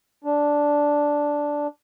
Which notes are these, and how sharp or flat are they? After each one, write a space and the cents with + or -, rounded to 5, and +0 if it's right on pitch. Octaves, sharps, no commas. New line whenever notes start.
D4 -5